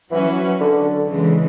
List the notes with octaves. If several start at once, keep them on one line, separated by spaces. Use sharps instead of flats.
E3 F#3 C#4 F#4 B4
D3
C#3 E3 G#3